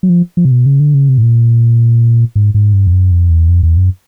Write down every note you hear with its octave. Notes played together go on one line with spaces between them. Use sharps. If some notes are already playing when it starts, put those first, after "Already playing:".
F#3
F3
F3
C3
B2
C#3
D3
C#3
C3
A2
A#2
G#2
G#2
G2
F2
F#2
F2
E2
F2
E2
F#2